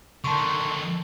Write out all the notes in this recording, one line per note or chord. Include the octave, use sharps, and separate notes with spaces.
D3 D#3 A5 C6 C#6